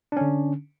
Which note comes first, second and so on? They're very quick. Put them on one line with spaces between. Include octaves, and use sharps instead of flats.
D4 C#4 D3